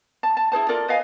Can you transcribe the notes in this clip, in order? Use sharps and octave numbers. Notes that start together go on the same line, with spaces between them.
A5
A5
E4 G#4 C5 A5
F4 A4 A#4 D5
B4 D#5 F5 G#5